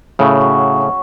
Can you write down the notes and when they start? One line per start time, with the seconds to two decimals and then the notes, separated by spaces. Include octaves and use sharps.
0.19 A2 C#3 F#3
0.38 C#4 F#4
0.57 F#3
0.77 C#4 F#4